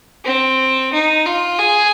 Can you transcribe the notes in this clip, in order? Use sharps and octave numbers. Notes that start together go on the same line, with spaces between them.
C4
D#4
F4
G#4